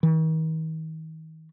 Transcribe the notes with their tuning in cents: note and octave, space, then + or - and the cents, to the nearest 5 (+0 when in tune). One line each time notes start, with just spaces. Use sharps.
D#3 +40